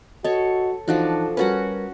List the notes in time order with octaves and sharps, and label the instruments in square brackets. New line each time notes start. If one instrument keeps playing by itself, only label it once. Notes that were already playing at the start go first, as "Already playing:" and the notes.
[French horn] F#4 [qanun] A4 C#5 [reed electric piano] D#5
[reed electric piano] E3 D#4 F#6 [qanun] F3 D4 F#4 [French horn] A4
[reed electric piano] G3 A#4 B4 [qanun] C#4 F#4 F#5